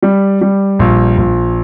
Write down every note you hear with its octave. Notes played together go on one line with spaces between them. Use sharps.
G3
G3
A#1
A#1